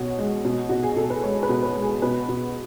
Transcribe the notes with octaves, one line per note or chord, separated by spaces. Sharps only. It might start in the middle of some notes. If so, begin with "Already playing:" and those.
Already playing: B2 C#5 F#5
G#3
B2
B2 F#4
G#4
B2 A4
B4
G#3 C#5
B4
B2
B4
G#3
G#4
B2 B4
B2